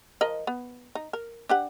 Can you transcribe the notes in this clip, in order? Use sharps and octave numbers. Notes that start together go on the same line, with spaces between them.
F3 A#4 D#5
B3
D#4
A#4
D4 G4 F#5